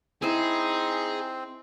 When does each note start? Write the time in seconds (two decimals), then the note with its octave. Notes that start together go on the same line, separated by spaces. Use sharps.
0.22 C4 D#4 E4 G#4 C5